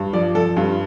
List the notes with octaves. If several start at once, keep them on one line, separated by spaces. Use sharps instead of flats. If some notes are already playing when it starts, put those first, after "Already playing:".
Already playing: G2
F3 D5
F3 A4
G2 F4